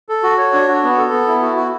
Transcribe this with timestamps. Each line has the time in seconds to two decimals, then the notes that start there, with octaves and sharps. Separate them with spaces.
0.09 A4
0.23 F#4
0.38 C#5
0.53 D4
0.68 F#4
0.84 B3
0.98 A4
1.12 B3
1.28 E4
1.42 F#4
1.56 F#4